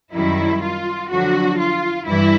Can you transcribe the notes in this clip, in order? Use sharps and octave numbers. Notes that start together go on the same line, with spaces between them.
F#2 D#3 G3 E4
F4
F2 D3 F#3 F#4
F4
G2 E3 G3 E4